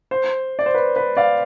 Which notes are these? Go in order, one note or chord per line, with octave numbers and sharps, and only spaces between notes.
C5
D5
C5
B4
B4
D5 F5